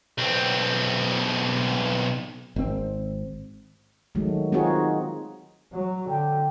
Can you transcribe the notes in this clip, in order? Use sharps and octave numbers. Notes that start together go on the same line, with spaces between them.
B1 C4
G#1 C4
D#3 F#3 G#3 A3
C4 D#4 F4 F#4 G#4 C#5
F#3
D3 G5